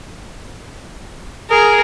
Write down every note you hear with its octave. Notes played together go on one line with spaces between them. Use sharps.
G#4 A#4